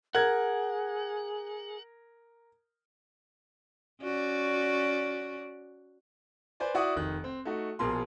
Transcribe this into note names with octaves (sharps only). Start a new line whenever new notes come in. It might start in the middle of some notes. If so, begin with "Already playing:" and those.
G#4 A#4 F#5 G#6
C#4 F#4 D5
B4 C5 D5 G#5
E4 F#4 D5 F#5 C#6 D#6
F1 D#3 F#6
C4
A3 D#4 F#4
A#1 B2 G#4 A#4 C6